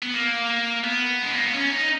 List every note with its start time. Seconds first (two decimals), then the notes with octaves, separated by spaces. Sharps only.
0.02 B3
0.14 A#3
0.84 B3
1.22 G#3
1.33 A#3
1.44 B3
1.54 C#4
1.72 D#4